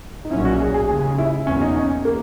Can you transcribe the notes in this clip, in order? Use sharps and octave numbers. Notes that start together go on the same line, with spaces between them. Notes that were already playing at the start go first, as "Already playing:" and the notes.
D#4
B1 A#2 F#3 C#4 E4
F#4
G#4
G#4
D#2 C#3 G#3 C#4 G#4
E4
E2 B2 F#3 A#3 C#4
D#4
C#4
A#3